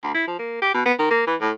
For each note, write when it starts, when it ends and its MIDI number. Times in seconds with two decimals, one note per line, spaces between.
0.04 0.12 38
0.15 0.23 64
0.27 0.38 53
0.39 0.60 58
0.62 0.73 67
0.74 0.85 47
0.86 0.94 59
0.99 1.08 51
1.10 1.24 58
1.27 1.35 52
1.41 1.51 45